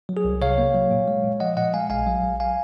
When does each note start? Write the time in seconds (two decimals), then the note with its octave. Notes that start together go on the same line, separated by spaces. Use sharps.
0.09 F#3
0.17 G#4
0.25 C2
0.41 C3 C#5 F5
0.58 A#3
0.75 F#3
0.91 A#2
1.08 G#3
1.24 A#2
1.40 F3 D#5 F#5
1.57 A#2 D#5 F#5
1.74 G#3 F5 G#5
1.90 A#1 F5 G#5
2.07 F#3
2.23 A#1
2.40 F5 G#5